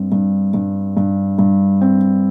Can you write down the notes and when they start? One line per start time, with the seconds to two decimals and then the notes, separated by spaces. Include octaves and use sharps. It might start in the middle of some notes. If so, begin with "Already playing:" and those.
Already playing: G2 C4
0.12 G2
0.54 G2
0.97 G2
1.39 G2
1.81 C4